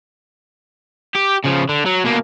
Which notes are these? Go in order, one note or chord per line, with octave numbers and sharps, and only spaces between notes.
G4
C#3 F3
D3
F#3
B2 A#3